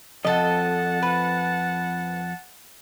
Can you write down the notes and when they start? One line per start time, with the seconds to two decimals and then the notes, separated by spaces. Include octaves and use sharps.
0.25 F2 A4 D#5 F#5 A5
1.02 B4